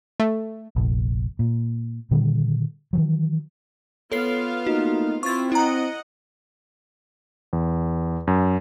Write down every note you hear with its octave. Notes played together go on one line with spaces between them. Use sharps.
A3
F1 A#1
A#2
A#2 D3 D#3 G3
D#3 E3 F#3
B3 F4 A4 C#5 F5 C7
A3 A#3 D#4 F#4
C4 E4 F4 C#6 A6
E4 D#5 F#5 A#5
E2
F#2